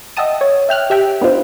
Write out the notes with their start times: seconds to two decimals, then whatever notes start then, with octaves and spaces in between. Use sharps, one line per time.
0.17 D#5 E5 F#5 G5 A5 D#6
0.41 C#5
0.69 E5 G5 F6 F#6
0.90 G4 E5 G5
1.21 B3 D4 D#4 F4 C5